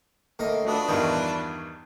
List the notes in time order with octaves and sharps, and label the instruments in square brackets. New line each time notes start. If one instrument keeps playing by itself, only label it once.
[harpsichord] A2 D3 D#5 [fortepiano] A#3
[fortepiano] A3 F#4 D#6 [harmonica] D4 F4 B4
[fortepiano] E2 G2 D#3 [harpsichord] F#4